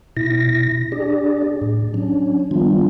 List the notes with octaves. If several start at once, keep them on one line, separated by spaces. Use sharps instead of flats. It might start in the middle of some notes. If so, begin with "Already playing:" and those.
B2 E4 A#6
D4 G4 G#4 D5
A2
F#3 C#4 D4
D#3 F3 G3 B3 D4 F4